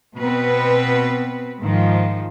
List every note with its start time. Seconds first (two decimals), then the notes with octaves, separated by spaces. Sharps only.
0.17 B2 B3 C4 B4
1.62 G#2 D#3 F3